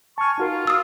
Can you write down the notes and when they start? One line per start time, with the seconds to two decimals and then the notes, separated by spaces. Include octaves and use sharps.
0.18 G#5 A5 C#6 F6
0.38 D#4 F4 F#4 A#4
0.67 D#6 E6